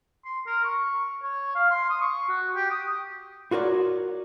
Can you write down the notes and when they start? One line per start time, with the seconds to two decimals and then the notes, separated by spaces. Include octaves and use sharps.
0.25 C6
0.46 A#4
0.64 C#6
1.22 C#5
1.55 F5
1.70 C6
1.90 D#6
2.01 C#6
2.29 F#4
2.55 G4
2.71 D#6
3.51 F4 F#4 A#4 C#5 D5